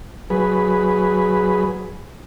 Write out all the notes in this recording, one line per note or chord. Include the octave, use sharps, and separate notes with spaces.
F#3 G#4 B4